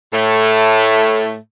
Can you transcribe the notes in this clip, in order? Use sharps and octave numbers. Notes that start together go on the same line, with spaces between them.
A2 A3